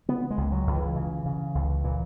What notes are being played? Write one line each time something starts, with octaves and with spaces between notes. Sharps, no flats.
C#3 B3
G#3
C#2
F#3
C#2
E3
C#3
C#3
C#2
A#2 E3